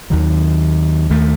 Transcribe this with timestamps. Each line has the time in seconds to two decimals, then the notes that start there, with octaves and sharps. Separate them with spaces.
0.10 D#2 D#3 F#3
1.10 D#2 D#3 A3